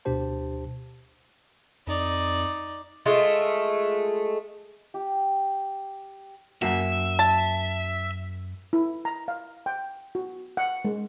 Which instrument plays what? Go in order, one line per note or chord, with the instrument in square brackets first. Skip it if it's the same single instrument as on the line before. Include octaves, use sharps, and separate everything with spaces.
[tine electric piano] D2 B2 D4 G4 C5 A5
[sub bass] F2 [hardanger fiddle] D#4 D5
[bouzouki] G#3 A3 F4
[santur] G4
[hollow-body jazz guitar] F#2 A#3 F#4 [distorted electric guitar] E5
[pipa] A5
[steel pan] E4
A#5
F5
G5
F#4
F#5
G#3